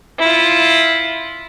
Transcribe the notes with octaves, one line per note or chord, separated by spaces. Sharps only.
E4 F4